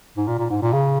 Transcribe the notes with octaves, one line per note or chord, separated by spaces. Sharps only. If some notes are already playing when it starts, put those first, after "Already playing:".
G#2
A#2
A#2
G#2
A#2
C#3